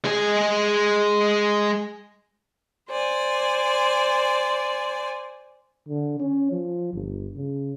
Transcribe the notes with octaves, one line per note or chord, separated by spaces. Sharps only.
G#3 G#4
C5 D5 G#5
D3
C#4
F3
G1
C#3